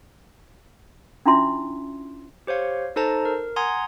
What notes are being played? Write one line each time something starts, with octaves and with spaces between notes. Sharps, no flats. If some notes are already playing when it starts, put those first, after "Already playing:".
C#4 D4 E4 F4 E5 C6
G4 C5 C#5 F5
D#4 A4 C5 A5 A#5
A#4
F#5 G#5 A#5 C6 D#6 G#6